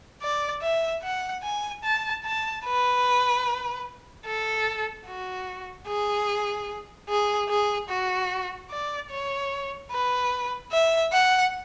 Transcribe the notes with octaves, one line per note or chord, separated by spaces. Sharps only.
D5
E5
F#5
G#5
A5
A5
B4
A4
F#4
G#4
G#4
G#4
F#4
D5
C#5
B4
E5
F#5